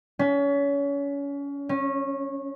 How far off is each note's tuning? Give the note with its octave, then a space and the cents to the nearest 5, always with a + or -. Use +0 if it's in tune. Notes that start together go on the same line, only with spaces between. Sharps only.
C#4 +30
C#4 -20